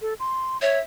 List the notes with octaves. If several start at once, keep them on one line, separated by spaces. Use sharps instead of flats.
A4
C6
C#5 E5